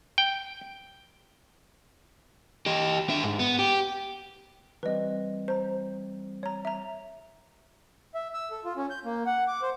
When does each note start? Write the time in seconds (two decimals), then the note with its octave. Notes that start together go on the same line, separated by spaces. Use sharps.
0.18 G5
2.66 G4 D#5
3.09 D4 E5
3.23 G#2
3.39 B3
3.59 G4
4.83 E3 G3 C4 B4 D#5
5.48 C5 A#5
6.43 C#5 A#5
6.65 E5 A#5
8.14 E5
8.34 E6
8.51 A4
8.64 F4
8.77 C#4
8.90 G6
9.05 A#3
9.26 F#5
9.48 D6
9.62 C5